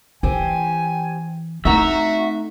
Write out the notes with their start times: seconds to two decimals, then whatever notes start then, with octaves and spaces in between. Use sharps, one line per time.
0.23 E3 C4 G4 G#5
1.65 A3 C4 D#4 F#4 E5 A#5